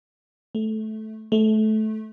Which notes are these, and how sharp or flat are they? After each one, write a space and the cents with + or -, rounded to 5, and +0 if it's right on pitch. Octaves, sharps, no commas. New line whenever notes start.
A3 -15
A3 -20